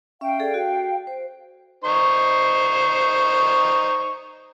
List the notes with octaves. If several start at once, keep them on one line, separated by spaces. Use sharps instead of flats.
C#4 E5 F5 G5
G#4 A4 D5
F#4
C5
D#4 C5 C#6